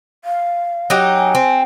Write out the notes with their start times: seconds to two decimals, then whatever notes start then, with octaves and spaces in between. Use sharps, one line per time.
0.25 F5
0.90 F#3 D#4 G4
1.15 G#5
1.35 C4